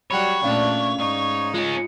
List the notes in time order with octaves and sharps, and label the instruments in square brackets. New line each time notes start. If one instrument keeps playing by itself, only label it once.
[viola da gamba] F#3 G3 F#4 [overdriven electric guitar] C#5 [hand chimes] G5 B5
[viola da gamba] A#2 A3 D4 [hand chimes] C#4 D5 F5
[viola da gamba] G#2 D#4
[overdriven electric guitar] G#3 C#4 [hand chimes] F4